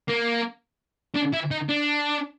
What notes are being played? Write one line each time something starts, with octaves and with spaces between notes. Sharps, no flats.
A#3
D4
E4
D#4
D4